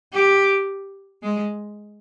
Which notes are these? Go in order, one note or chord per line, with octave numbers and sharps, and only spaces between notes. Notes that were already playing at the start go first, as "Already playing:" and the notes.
G4
G#3